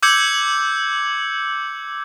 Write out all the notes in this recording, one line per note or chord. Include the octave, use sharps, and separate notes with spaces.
D6 E6 G6 G#6 C#7 F#7